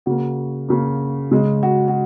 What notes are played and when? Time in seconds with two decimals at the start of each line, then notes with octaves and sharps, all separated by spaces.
0.06 C#3 A#3 F#4
0.69 C#3 A#3
1.32 C#3 G#3
1.63 F#4
1.88 F#4